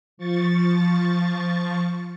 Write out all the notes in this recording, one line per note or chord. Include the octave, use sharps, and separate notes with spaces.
F3 C#6 A6